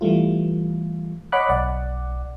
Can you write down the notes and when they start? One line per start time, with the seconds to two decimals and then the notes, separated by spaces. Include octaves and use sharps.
0.01 E3 G3 A3 F4
1.32 C#5 D#5 F#5 B5 D6 F#6
1.49 B1 D5 F#5